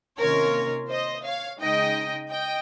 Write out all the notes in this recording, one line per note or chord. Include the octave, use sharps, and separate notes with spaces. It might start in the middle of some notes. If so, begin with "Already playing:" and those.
C3 D#3 A#3 C#4 F4 A#4 C#5
C5 D#5
C#5 F5
C#3 G#3 D#4 D#5 G5
D#5 G5